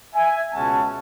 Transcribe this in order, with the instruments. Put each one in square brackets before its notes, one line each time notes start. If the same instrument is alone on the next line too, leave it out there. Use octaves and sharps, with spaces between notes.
[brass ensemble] E5 G#5
C#2 B2 G#3 C#4 F#5 A5